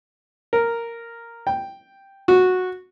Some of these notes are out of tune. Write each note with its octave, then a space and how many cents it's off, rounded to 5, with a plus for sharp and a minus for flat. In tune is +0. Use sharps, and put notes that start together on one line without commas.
A#4 -5
G5 +0
F#4 -10